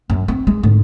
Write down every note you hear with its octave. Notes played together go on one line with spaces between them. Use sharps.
F#2
C4
G#3
G#2 D3